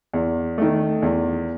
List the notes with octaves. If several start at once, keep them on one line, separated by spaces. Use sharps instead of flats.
E2
D#3 A3
E2